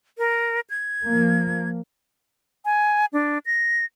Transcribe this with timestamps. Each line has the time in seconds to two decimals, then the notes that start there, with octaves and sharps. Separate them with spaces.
0.18 A#4
0.70 G#6
1.04 F3 A#3
2.65 G#5
3.13 D4
3.46 A#6